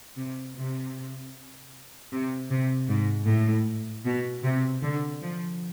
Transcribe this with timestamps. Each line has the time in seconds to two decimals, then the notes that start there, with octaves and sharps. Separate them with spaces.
0.17 C3
0.56 C3
2.12 C3
2.51 C3
2.89 G#2
3.27 A2
4.06 B2
4.44 C3
4.83 D3
5.22 F3